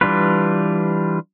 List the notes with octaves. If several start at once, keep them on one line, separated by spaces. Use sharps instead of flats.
E3 G3 D4 F4 B4